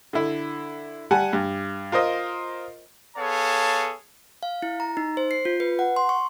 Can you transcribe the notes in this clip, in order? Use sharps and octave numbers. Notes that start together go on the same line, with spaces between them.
D3 E4
G3 F#5 G#5 A5
G2
F4 A#4 C5 D#5
B3 G#4 A4 C#5 F5 A5
F5
E4
A#5
D#4
C5
C7
F4
B4
F#5
C6
C#6